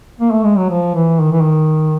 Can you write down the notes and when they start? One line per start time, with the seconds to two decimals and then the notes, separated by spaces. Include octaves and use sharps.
0.20 A#3
0.32 A3
0.44 G#3
0.57 F#3
0.69 F3
0.95 E3
1.20 D#3
1.32 E3
1.42 D#3